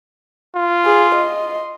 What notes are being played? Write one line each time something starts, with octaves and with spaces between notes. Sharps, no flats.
F4
G#4
D#5 C6